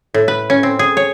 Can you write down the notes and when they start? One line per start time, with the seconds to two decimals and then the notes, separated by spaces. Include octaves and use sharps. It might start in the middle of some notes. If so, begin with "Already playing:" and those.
0.14 A2
0.28 B4
0.50 C#4
0.63 C4
0.79 G#4
0.97 C#5